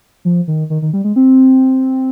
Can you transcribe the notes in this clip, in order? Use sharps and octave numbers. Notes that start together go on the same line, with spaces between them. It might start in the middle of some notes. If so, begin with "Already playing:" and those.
F3
D#3
D#3
D#3
G3
G#3
C4